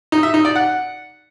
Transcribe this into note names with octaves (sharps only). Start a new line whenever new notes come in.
D#4
E5
D#4
D5
F#5